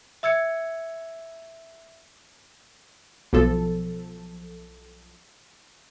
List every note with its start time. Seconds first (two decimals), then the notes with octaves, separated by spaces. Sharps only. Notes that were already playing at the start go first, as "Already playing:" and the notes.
0.23 E5 E6 G#6 C#7
3.33 B1 F3 A4